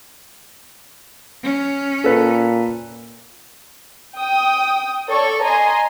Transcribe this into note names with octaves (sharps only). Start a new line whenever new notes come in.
C#4
A#2 A4 B4
G5 D#6
A4 C#5 D5 C#6
D#5 G#5 A#5 C6